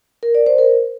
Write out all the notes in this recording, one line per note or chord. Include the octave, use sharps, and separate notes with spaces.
A#4
D5
C5
A#4